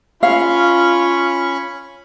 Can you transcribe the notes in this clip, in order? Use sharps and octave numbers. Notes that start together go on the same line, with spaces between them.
C#4 F4 F5 B5 C#6